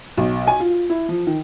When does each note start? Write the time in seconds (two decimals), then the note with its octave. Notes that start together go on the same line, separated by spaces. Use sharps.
0.18 B1
0.47 G#5
0.60 F4
0.90 E4
1.09 F3
1.27 D#3